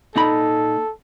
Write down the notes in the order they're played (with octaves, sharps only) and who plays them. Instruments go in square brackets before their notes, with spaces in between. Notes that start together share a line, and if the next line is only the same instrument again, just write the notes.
[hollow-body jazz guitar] A#2 D#4 B5 [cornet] A4